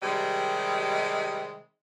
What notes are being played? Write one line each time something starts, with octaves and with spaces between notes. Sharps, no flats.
C3 D#3 G3 G#3